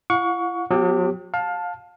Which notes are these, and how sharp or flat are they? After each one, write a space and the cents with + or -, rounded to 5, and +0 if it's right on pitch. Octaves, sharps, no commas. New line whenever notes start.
E4 +45 F#5 -40 C#6 +20
F#3 -40 B3 +0 G4 +0
F5 +25 A5 +0